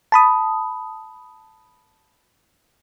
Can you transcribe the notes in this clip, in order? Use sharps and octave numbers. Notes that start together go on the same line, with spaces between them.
A5 B5 D#6